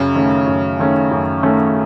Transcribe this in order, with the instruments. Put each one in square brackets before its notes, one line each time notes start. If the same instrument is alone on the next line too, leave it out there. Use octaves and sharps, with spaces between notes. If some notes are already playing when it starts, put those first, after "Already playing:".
Already playing: [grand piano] F#2 [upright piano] C#3
[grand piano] D#3 A3 C#4
F#2
D#3 A3 C#4
F#2
D#3 A3 C#4